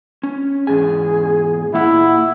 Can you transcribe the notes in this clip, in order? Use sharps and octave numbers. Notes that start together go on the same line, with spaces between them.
C#4
E2 G#2 G#4 G#5
A#2 A#3 E4 F#5